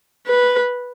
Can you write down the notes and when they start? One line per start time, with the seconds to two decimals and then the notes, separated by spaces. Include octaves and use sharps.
0.27 B4